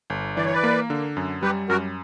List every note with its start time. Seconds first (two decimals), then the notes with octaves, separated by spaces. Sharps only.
0.10 G1
0.37 E3 D5
0.45 C#5
0.53 B4 D5
0.64 A#3
0.90 D3
1.17 F#2
1.42 G3 G4 B4
1.69 F#2 F#4 A#4